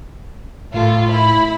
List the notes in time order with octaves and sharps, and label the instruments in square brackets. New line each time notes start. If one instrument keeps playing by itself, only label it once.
[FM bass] A2 [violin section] F4 A4
[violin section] E4 B5